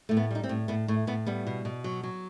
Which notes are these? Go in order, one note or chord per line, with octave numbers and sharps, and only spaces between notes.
A2 A3
B3
G3 D#4
C4
A2
A2 B3
A2 A3
A2 B3
G3 B3
B2
B2
F#3
F#3